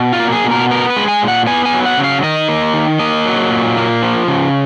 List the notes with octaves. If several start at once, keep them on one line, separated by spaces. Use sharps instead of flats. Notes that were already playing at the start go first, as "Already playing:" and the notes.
Already playing: B2
F4
A#3
G#4
B2
A#4
B3 A#4
B4
G#3
G#5
A#2
F#5
B3 G#5
G#5
F#3
F#5
C#3
F5
D#3 D#5
A#3
D#3
A#3 D#5
F#3
A#2
A#3
F3
C#3